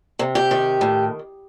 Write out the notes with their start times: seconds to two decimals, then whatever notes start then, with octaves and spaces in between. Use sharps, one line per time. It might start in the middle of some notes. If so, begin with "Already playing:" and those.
0.19 C3
0.35 G4
0.51 D#3
0.81 A2